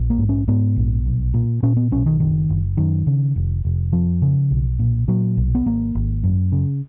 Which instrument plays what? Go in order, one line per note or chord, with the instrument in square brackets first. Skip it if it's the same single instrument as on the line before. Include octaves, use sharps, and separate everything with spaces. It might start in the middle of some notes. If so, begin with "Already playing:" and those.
Already playing: [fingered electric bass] A#1
A#3
G#2
C#4
G#2 B3
A#1
B1
A#2
A#2 C#4
B3
B1 C#4
D#3
F#1 D#3
F#1
F#2 D#3
C#3
F1
F1
F2 F3
C#3
B1
A#2
A#2 F#3
B1
B3
G#1 A#3
G#1
F#2
C#3